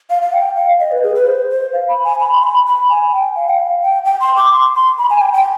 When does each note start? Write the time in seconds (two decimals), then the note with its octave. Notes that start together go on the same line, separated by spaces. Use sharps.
0.10 F5
0.22 F5
0.33 G5
0.57 F5
0.80 D#5
0.91 B4
1.03 G#4
1.15 B4
1.26 C5
1.50 C5
1.73 F5
1.89 B5
2.04 G#5
2.20 B5
2.34 C6
2.43 B5
2.66 B5
2.89 G#5
3.12 G5
3.36 F5
3.49 G5
3.59 F5
3.82 G5
4.05 G5
4.20 C6
4.36 D6
4.52 C6
4.75 C6
4.98 B5
5.10 G#5
5.21 G5
5.33 G5